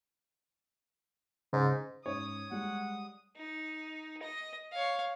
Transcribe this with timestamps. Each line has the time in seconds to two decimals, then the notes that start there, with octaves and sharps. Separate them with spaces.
1.53 G#2 C#3
2.06 G#2 C#4 C#5 D#6
2.51 G3 G#3 F#5
3.37 D#4
4.23 D#5
4.72 C#5 F5